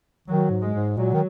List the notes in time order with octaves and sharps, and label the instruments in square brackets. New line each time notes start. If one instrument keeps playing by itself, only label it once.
[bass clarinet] D#3 [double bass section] F#3
[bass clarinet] G#2
[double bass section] G#3
[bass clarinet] G#2
[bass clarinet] A#2 [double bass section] F#3
[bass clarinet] D#3